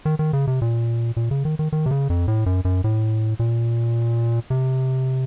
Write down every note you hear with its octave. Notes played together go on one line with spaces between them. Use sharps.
D#3
D#3
C#3
C3
A#2
A#2
C#3
D#3
D#3
D#3
C3
C#3
F2
A2
F#2
F#2
A2
A#2
C3